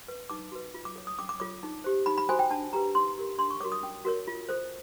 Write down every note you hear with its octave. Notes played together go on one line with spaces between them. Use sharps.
B4
D#4 D6
F#4 B4
F4
D6
A4 C#5
D#6
C#4 D6
D6
F4 A4 C#5 D6
D#4
G4 C5
D#4 B5
B5
F#4 A4 C5 G#5
G5
D4 A5
G4 B4 A#5
D#4 C6
G4 A#4
D4 C6
C#6
F#4 A#4 C#5 D6
D#6
C#4
F#4 A#4 C#5
F4
A4 C5